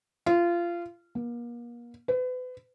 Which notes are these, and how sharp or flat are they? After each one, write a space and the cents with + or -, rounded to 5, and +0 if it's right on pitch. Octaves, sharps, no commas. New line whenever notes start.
F4 -20
A#3 +40
B4 +35